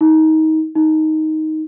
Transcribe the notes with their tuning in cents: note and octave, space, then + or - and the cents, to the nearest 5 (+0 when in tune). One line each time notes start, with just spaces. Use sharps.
D#4 +25
D#4 +10